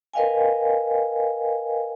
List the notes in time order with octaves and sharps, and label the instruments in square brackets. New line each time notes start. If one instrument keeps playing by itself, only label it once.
[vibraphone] A#4 B4 D#5 F5 G5 G#5